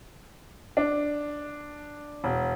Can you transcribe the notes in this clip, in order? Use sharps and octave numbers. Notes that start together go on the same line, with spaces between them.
D4
E1